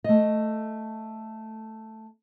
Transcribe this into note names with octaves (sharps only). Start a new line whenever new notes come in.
A3 D#5